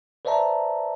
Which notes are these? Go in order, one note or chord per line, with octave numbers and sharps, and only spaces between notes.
B4 C5 D5 E5 A5 A#5